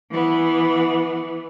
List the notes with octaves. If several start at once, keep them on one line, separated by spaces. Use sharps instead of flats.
E3 B3